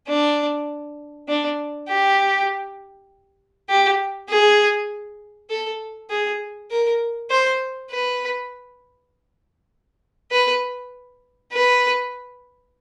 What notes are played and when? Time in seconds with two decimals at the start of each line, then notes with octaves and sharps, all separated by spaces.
0.08 D4
1.28 D4
1.89 G4
3.69 G4
4.29 G#4
5.50 A4
6.10 G#4
6.71 A#4
7.31 C5
7.91 B4
10.31 B4
11.52 B4